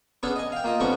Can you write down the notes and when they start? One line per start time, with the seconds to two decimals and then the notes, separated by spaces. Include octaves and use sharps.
0.23 B3 C#4 D4 G#4 A4
0.36 D#5 G#5
0.52 F5 G5
0.64 A#3 F4 D#5
0.80 F2 D3 G3 B3 D4 C#6